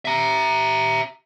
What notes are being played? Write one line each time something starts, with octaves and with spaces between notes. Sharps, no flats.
E5 A#5